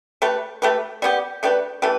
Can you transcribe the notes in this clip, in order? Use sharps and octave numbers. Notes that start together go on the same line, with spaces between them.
A3 G4 B4
A3 G4 B4
G3 B3 G4
A3 D4 G4 B4
E3 A3 G4 B4